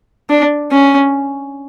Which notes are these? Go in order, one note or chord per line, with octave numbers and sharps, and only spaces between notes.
D4
C#4